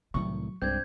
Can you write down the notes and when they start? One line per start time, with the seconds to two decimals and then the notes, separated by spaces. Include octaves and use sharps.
0.14 C2 A2 D#3 F#3 C#6
0.62 C2 G2 G#3 C4 D4 G6 G#6